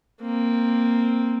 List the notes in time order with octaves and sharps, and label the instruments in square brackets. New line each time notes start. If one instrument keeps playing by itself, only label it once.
[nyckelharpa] A#3 C4